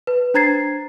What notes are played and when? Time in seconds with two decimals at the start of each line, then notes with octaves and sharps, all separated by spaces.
0.07 B4
0.34 D4 C5 A#5 G#6 A6 C7